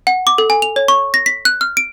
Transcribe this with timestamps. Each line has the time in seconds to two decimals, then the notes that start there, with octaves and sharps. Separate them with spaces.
0.07 F#5
0.27 D6
0.38 A4
0.50 G#5
0.62 F7
0.76 C#5
0.88 C#6
1.14 A#6
1.26 B6
1.45 F#6
1.61 F6
1.77 D7